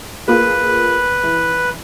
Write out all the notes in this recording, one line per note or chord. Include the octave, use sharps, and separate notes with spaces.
A#3 F4 G#4 B4
E3